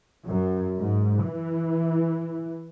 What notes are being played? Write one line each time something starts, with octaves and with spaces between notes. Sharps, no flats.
F#2
G#2
E3